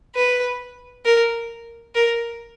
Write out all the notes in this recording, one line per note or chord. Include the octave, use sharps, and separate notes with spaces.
B4
A#4
A#4